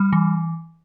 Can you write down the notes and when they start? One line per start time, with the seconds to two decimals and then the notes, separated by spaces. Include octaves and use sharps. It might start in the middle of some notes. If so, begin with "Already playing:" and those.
Already playing: G3
0.13 E3